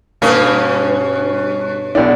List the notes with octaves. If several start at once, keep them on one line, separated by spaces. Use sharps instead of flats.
G2 B2 A#3 C#4
B1 D4